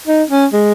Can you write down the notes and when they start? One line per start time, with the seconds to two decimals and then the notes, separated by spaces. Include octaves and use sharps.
0.07 D#4
0.30 C#4
0.53 G#3